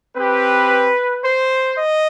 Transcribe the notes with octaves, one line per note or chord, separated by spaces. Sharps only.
C4 G4 B4
C5
D#5